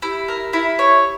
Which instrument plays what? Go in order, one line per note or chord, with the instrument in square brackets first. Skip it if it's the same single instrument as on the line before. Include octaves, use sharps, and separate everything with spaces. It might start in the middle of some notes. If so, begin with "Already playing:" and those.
[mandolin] E4 [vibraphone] G4
[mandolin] A#4
E4
C#5